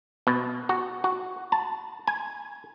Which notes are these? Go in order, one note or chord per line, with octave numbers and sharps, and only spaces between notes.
B2
F#4
F#4
A5
G#5